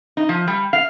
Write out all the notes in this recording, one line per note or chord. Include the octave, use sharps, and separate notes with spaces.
D#4
F3
G3
F5